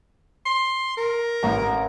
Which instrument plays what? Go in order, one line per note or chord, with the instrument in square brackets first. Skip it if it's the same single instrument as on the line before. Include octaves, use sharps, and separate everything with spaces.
[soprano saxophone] C6
A#4
[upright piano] A1 A#5